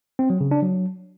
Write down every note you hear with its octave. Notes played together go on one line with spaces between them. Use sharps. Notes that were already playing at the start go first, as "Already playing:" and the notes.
C4
F#3
C#3
D4
F#3